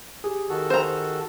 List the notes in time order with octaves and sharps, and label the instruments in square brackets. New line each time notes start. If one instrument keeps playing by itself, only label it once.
[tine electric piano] G4 G#4
[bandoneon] D#3 F#4 A4
[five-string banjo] C5 A#5